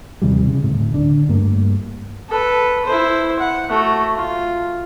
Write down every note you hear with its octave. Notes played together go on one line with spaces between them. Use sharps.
D#2 C3 E3 G3
C#3
D1 A2
D3 D4
G2 A3 A#3
A4 B4
E4 C5
F#5
A3 F#4
F4